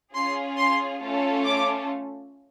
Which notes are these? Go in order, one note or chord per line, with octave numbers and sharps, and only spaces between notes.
C#4 F4 G#4 C6
C6
A3 C#4 F4 A4
D6